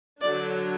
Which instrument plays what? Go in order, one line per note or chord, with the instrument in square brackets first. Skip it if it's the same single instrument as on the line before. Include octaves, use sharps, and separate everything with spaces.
[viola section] D3 F#3 D4 D5